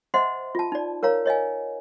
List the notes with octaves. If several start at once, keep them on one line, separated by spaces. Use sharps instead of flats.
C5 D#5 E5 F#5 C6
F4 A5
D#4 D5
A#4 C#5 F5 A#5
C#5 D#5 F5 G#5